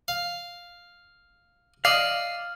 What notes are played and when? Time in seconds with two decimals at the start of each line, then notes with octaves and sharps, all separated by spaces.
0.08 F5
1.85 D5 D#5 F5